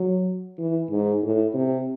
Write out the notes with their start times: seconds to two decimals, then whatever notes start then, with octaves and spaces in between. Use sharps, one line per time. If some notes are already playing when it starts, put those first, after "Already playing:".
Already playing: F#3
0.58 E3
0.91 G#2
1.23 A2
1.54 C3